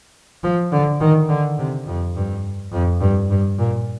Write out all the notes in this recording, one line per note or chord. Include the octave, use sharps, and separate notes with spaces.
F3
D3
D#3
D3
C3
F2
G2
F2
G2
G2
A#2